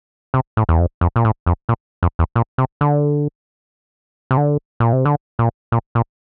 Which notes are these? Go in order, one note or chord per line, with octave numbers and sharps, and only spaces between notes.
C3
A2
E2
F2
F2
A#2
A2
F2
A#2
F2
E2
A#2
C3
D3
C3
D3
A#2
C3
D3
A#2
A#2
A#2